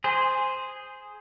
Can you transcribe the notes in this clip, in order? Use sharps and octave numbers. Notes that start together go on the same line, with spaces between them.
G#4 C5